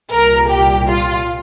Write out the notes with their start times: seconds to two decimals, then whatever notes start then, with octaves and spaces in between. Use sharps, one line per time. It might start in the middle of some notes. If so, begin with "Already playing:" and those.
0.11 C2 A#2 A#4
0.50 G4
0.89 F4